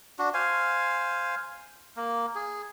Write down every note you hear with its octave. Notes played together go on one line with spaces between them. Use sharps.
D4 F#4
C5 F5 G#5
A#3
G#4